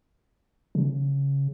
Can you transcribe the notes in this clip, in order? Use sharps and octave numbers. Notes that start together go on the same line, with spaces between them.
C#3